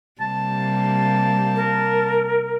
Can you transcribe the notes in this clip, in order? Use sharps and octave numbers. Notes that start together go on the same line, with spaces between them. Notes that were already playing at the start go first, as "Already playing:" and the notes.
C3 G3 A#3 A5
A#4